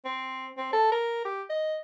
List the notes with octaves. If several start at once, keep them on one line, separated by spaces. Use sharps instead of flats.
C4
C4
A4
A#4
G4
D#5